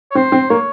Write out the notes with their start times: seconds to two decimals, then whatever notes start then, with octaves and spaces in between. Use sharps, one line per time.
0.11 C#5
0.15 C4 C5
0.32 C4
0.49 A#3 C#5